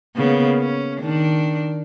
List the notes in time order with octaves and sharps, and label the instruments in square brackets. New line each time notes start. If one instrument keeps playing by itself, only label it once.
[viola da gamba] C#3 A#3 B3
C#4
D#3 D4